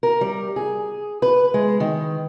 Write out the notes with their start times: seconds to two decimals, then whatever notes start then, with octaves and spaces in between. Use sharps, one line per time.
0.03 A#4
0.21 G3
0.56 G#4
1.22 B4
1.54 G#3
1.80 D#3